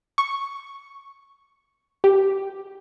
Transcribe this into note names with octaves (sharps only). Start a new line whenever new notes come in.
C#6
G4